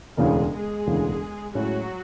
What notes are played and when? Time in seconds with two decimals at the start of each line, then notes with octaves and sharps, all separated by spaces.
0.17 E1 D2 C#3 E3 G#3 G#4
0.52 G#3 G#4
0.86 E1 D2 C#3 E3
1.54 A2 F#3 G#3 C#4 E4 F#4